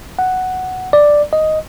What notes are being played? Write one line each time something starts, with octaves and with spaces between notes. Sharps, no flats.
F#5
D5
D#5